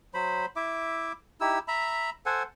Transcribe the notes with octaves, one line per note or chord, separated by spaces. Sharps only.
F#3 C5 B5
E4 E5 D6
D#4 E4 G4 E6
E5 A#5 B5
A4 C5 F#5 G#5